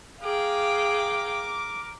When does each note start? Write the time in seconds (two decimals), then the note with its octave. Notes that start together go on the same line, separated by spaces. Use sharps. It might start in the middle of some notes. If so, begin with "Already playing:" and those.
0.22 G#4 A#4 F5 G5 D6